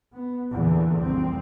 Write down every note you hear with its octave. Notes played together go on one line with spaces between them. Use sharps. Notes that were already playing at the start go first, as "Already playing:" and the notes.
B3
E2 A#2 D3
F1 C2 F2 C4